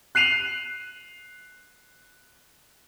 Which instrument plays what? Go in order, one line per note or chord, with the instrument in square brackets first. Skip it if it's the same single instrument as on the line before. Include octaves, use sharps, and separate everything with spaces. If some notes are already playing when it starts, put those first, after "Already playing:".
[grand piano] F#6 C7 D#7 F7 F#7